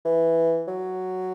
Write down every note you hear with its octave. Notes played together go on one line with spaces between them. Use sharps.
E3
F#3